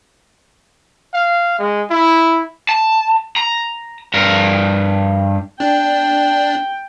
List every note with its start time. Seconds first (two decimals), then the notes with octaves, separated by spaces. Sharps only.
1.14 F5
1.59 G#3
1.90 E4
2.69 A5
3.37 A#5
4.14 G2 A#4
5.60 D4 G5